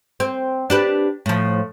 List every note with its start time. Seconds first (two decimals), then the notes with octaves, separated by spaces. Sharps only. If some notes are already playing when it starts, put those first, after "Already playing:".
0.20 C4
0.70 D4 G4 B4
1.26 A2 F3